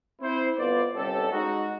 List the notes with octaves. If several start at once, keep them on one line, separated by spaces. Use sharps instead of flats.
C4 E4 C5
G1 B3 F4 C5 D5
G1 C2 C#4 G4 A4
G#3 D#4 F#4